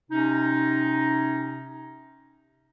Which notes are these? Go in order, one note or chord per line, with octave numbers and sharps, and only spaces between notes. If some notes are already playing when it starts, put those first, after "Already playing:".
C3 C#4 D#4